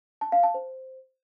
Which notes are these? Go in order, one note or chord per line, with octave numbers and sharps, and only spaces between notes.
A5
F5
A5
C5